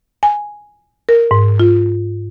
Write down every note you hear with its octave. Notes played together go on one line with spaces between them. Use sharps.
G#5
A#4
G#2
F4